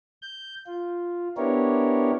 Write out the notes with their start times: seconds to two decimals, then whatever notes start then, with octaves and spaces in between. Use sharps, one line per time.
0.22 G6
0.67 F4
1.37 B3 D4 E4 G4 A#4 C#5